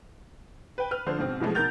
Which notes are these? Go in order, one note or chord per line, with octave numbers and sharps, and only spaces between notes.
B4 G5
B4 F6
D3 F3 C5
G#2 B2 C4
B2 E3 F3 G#3 A3
B2 D#3 A#4 G6 A6 F7